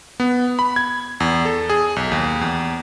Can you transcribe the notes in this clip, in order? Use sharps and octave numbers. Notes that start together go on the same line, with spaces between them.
B3
B5
G#6
E2
A4
G#4
B1
D#2
E2